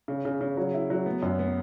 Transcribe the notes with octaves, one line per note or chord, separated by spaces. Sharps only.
C#3
C#3
C#3
F#3
E4
F#3
B3
F#2
B3